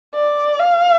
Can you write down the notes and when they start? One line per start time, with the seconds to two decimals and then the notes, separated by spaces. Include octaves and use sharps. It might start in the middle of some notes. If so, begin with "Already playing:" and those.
0.15 D5
0.60 F5